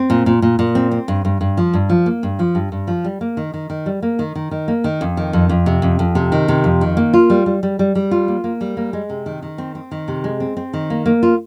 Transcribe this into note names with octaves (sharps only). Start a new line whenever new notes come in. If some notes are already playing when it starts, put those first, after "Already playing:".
Already playing: C4
A#2
A#2
A#2
A#2
C4
C4
G2
G2
G2
F3
G2
F3
A#3
G2
F3
G2
G2
F3
G3
A#3
D#3
D#3
D#3
G3
A#3
D#3
D#3
D#3
A#3
D#3
F2
D#3
F2
F2
C3
F2
F2
C3
D#3
C3
F2
D#3
A#3
F4
G3
G3
G3
G3
G3
F4
A#3
A#3
G3
A#3
G#3
C3
D#3
D#3
C4
C4
D#3
C3
G#3
C4
C4
D#3
A#3
A#3
F4